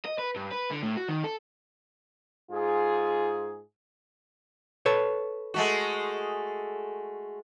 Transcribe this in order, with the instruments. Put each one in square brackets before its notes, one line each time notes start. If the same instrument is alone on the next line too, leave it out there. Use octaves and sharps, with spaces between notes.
[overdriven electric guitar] D#5
B4
G2
B4
D3
A2
F#4
D#3
A4
[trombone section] G#2 F4 G#4
[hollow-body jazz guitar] A4 B4 C#5
[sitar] G#3 A3 F#4